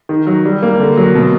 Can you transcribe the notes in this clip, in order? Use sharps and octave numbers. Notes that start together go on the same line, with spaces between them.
D#3
F#3
G3
A#3
D3
F#3
B2